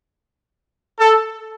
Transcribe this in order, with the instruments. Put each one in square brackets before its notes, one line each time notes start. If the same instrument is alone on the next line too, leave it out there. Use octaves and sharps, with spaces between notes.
[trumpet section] A4